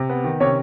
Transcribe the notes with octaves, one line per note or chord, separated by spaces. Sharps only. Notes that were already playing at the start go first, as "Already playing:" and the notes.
Already playing: C3
B3
D#3
C3 C#4 C#5